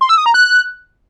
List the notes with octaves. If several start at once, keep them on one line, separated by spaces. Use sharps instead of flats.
C6
E6
D#6
A#5
F#6